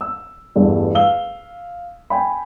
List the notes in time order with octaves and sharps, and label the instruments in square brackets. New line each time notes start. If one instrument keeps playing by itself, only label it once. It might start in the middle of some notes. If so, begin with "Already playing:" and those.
[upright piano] E6
G1 E2 G2 A3
F5 E6 G7
G5 G#5 B5